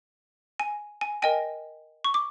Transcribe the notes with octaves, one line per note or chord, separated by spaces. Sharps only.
G#5
G#5
A#4 D#5 G5 G#5
C#6
D6